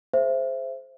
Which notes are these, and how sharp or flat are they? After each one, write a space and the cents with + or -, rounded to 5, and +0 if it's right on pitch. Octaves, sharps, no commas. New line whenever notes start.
G#4 +35 C5 +0 E5 +20